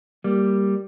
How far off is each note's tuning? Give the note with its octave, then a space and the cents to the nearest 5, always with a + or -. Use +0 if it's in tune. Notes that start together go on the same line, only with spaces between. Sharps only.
G3 +0 A#3 +0